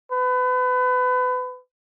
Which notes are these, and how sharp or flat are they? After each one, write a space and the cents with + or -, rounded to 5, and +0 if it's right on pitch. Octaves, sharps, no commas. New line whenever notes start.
B4 +30